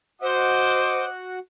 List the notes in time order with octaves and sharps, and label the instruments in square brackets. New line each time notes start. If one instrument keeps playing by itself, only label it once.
[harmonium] F#4 F#5 [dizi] C5 [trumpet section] D#5 D6